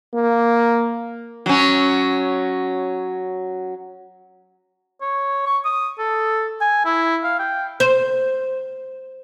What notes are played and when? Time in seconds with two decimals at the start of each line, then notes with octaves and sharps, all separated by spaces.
0.14 A#3
1.46 F#3 C#4
5.01 C#5
5.46 C#6
5.65 D#6
5.99 A4
6.61 G#5
6.85 E4
7.23 F5
7.39 G5
7.80 C5